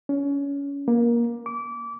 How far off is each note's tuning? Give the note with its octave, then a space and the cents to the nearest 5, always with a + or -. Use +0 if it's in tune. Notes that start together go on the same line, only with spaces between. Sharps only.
C#4 +25
A#3 +20
D6 -25